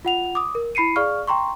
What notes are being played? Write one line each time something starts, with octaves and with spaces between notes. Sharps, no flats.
F4 F#5 F7
D6 D#6
A#4
E4 B5 C7 C#7 D#7
G#4 D5 F5 C#6 F6
G5 A#5 C6 C#6